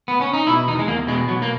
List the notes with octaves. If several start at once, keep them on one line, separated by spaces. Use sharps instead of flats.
B3
C#4
D#4
B2 E4
E2 D#4
G#3
E2 A#3
B2 G#3
B2 F#3
A#3